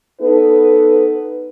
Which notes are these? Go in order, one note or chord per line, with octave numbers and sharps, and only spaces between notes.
B3 D#4 A4 B4